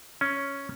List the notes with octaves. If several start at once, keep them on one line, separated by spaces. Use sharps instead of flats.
C#4